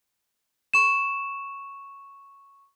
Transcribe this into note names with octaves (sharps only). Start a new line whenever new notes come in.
C#6 E7